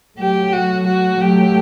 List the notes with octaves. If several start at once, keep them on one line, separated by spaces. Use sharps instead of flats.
F#3 A3 G4
F#4
F#4
F#3 A3 G4